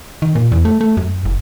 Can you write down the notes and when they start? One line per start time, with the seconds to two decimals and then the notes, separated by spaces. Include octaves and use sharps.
0.22 D#3
0.35 A#2
0.52 E2
0.65 A3
0.81 A3
0.97 F#2
1.25 F#1